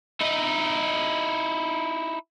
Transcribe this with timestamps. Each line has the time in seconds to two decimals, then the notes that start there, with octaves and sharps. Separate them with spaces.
0.21 D#4 E4